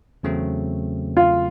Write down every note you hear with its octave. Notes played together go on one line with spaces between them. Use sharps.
E2 C#3 F#3 A3 C4
F4